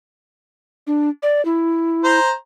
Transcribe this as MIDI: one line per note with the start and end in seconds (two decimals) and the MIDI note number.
0.87 1.09 62
1.23 1.44 74
1.45 2.19 64
2.04 2.31 72
2.04 2.31 82